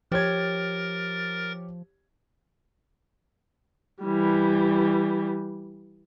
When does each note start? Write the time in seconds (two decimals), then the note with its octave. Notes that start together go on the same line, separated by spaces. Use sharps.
0.12 F3 G4 A#4 C#5 G#6 A6
4.03 E3 G3